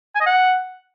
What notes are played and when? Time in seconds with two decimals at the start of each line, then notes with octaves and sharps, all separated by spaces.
0.15 G#5
0.21 D#5
0.26 F#5